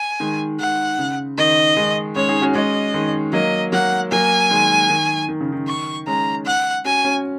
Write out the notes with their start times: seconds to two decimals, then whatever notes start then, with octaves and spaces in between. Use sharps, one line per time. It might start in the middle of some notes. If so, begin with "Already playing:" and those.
Already playing: G#5
0.20 D#3 G#3
0.60 D#3 F#5
0.99 C#3
1.38 D#3 D#5
1.77 D#3 G#3
2.16 G#3 C#4 C#5
2.29 D#4 G#4
2.42 C#4 F#4
2.55 G#3 C#4 D#5
2.94 D#3 G#3
3.33 F#3 A#3 D#5
3.72 F#3 A#3 F#5
4.12 F#3 A#3 G#5
4.51 D#3 G#3
4.90 D#3
5.29 D#3
5.41 C#3
5.52 D#3
5.68 C#6
6.07 G#3 C#4 A#5
6.46 F#5
6.85 C#4 F#4 G#5
7.05 C#4 F#4